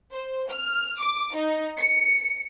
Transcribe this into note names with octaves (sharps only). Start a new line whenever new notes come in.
C5
F6
D6
D#4
C#7